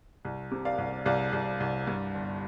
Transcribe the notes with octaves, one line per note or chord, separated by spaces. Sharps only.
C2
C3
D5 F5
C2
C2 D5 F5
C2
C2
G2
G1